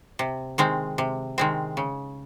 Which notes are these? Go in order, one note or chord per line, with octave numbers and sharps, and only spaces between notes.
C3
D#3 G#3 C4
C3
D#3 G#3 C4
C#3